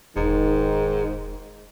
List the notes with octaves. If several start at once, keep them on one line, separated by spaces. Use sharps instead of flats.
E1 G#2 D#3